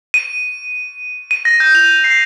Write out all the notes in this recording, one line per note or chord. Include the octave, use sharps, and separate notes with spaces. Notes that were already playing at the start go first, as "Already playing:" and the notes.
D#7
D#7
A#6
G6
F7
C7